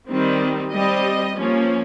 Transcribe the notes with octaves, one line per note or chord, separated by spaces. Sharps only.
D#3 G3 C4
G3 C4 D#5
F3 A#3 C#4